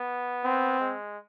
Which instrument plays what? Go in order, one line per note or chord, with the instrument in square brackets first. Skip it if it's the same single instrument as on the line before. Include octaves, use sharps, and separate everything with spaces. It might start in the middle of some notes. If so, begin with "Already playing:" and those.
Already playing: [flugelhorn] B3
[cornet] C4
[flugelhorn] G#3